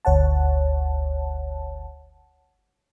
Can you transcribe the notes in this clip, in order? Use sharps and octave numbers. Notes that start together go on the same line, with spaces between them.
G1 D2 C#5 F#5 A5